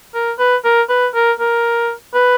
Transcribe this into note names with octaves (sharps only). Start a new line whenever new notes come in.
A#4
B4
A#4
B4
A#4
A#4
B4